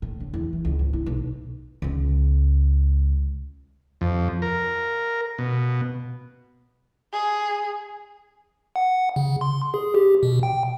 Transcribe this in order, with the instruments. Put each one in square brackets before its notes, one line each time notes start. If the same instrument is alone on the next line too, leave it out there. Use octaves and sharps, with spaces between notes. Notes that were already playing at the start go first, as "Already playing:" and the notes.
[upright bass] A2
D3
E2
E3
C#2
G#1
E4
B1
C#2 G#3
[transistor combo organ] F2
A#4
B2
[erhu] G#4
[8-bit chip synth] F#5
C#3
C6
G#4
G4
B2
G5